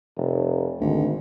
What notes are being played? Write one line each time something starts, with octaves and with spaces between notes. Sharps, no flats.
F1
G#1 D2